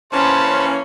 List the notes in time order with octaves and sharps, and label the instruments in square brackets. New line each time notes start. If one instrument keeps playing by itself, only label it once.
[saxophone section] E3 A#3 C#4 [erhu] C5 [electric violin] A5 B5